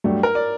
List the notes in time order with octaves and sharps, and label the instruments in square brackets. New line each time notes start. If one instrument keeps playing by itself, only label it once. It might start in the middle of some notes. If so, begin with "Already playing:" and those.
[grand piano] G2 F#3 A3 D4 G4
[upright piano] A#4
D5